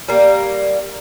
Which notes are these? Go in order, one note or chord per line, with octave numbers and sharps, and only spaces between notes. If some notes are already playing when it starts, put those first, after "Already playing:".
G3 A#3